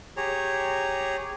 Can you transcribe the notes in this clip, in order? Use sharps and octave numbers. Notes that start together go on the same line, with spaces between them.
G4 G#4 C#5 A#5